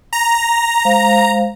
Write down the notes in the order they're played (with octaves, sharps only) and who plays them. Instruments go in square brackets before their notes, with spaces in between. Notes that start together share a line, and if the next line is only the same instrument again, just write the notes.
[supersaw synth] A#5
[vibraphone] G#3 C5 F5